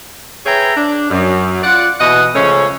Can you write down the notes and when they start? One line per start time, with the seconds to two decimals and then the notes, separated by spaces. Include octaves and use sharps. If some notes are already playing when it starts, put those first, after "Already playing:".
0.46 G#4 B4 C#5 E5 G5 A#5
0.76 D4
1.10 F#2
1.63 F4 D5 F#5
2.00 B2 E3 B4 D#5 F#5
2.34 C#3 F3 G#3 A3 C#4